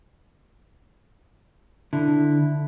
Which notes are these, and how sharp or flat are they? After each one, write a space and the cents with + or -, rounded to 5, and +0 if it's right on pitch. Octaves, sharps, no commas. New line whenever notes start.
D3 +0 E4 +0